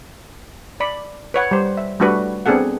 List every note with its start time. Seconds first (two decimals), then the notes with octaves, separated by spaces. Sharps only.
0.80 D5 B5
1.34 B4 C#5 F#5
1.51 G3 C5
1.77 E5
2.00 G3 A3 D4 F#4 B4
2.46 B3 C4 D4 G#4 A4 F#5